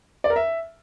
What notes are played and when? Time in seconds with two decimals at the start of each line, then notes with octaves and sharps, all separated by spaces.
0.24 D5
0.30 A#4
0.36 E5